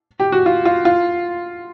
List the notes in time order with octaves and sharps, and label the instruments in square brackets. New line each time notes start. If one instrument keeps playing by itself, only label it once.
[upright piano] G4
F#4
F4
F4
F4